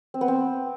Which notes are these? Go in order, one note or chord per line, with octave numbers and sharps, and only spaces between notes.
C4
B3
C4